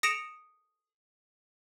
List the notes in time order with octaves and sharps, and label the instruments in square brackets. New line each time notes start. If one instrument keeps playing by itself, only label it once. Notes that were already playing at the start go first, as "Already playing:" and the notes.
[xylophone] D#6 A#6 C#7 D7 E7 F7